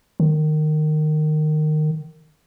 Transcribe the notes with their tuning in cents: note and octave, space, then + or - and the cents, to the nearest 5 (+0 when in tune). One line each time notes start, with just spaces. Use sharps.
D#3 -20